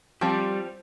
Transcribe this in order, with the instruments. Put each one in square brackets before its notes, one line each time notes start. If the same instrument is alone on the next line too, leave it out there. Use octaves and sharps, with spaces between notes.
[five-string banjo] F3 C4 [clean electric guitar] G3 G4